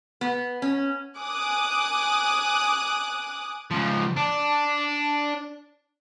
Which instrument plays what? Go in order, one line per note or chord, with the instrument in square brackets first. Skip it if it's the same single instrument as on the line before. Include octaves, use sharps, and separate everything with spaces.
[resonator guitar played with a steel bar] B3
C#4
[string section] G#5 D6 D#6 F#6
[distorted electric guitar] C#2 F3
D4